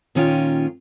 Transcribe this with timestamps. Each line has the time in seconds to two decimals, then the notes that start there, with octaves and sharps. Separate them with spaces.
0.15 A#2 D#3 C#4 F4 G5